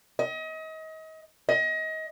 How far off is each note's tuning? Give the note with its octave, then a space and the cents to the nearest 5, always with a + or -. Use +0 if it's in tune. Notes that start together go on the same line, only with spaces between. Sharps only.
D#5 +35
D#5 +30